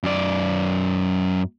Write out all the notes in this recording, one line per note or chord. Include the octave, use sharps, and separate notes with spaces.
F#2 D5